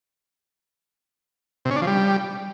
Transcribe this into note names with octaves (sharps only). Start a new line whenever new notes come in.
C3
C#4
D4
F3
G3